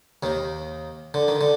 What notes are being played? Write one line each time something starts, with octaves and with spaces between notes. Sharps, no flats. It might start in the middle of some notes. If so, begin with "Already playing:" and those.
D#2 D#3
D3
D#3
D3